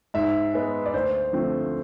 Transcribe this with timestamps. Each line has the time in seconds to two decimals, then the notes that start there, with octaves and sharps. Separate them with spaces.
0.14 G#2 E5
0.54 G#3 B3
0.86 D5
0.94 D2 C5
1.33 D3 F3 A3 C4